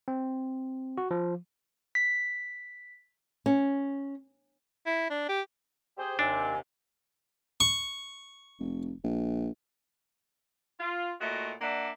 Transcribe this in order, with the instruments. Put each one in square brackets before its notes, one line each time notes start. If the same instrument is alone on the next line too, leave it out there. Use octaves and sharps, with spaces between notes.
[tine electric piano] C4
F#4
F3
[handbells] B6
[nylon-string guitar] C#4
[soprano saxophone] E4
D4
G4
[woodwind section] G4 G#4 C5
[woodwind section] D#2 C3 [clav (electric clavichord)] D4 [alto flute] G#5
[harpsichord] C#6
[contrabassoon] F1
A#1
[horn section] F4
A#2 A3 E4 F#4 C#5 D#5
A#3 D4 D5 E5 F#5